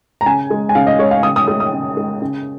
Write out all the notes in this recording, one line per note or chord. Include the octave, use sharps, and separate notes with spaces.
A#5
C#3 G#5
G#3
G#5
C#3 F5
D#5
G#3 C#5
F5
C#3 D#6
D#6
G#3 D#6
D#6
C#3
G#3
C#3